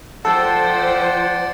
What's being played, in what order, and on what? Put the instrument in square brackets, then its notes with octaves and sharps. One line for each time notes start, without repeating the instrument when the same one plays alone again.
[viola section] F3 C5 G5 [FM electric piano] A4 [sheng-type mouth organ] D5 F#5